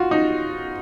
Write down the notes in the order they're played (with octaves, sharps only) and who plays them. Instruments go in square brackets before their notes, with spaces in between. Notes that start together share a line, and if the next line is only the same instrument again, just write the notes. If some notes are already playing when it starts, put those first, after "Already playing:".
Already playing: [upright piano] F4 F#4
D#4